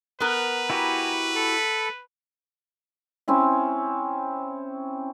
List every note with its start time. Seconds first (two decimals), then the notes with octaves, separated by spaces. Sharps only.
0.20 B3 A#4 B4
0.70 E4 F#4 G4 G#5 A#5 B5
1.35 A4 B5
3.28 C4 C#4 E4